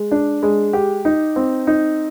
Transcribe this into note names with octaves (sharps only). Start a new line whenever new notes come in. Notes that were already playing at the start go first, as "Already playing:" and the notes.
Already playing: G#3
D4
G#3
G4
D#4
C4
D#4